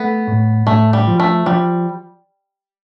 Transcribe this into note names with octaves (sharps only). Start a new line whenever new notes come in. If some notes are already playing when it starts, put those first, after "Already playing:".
Already playing: A3 B3
A2
A2 A3
G3
F3
A3
F3 G3